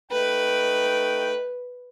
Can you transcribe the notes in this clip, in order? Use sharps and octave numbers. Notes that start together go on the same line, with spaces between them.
A3 D#4 B4 G5